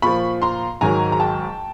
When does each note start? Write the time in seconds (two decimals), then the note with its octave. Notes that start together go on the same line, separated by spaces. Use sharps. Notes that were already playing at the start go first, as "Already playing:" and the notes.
0.02 A#2 F3 B5 C#6
0.42 A#5 C6
0.81 G#2 D#3 F#3 G#5 A#5
1.12 A#5
1.20 G5 A5